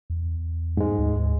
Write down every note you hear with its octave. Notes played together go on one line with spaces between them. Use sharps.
E2
G#2 G#3
D2